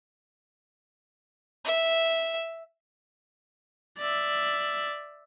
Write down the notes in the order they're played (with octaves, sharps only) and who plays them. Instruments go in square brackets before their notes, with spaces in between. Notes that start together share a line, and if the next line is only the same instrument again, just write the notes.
[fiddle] E5
[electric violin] D5 E5